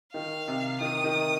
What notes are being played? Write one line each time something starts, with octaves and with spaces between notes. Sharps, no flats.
D#3 F5
C3
D#3 D#6
D#3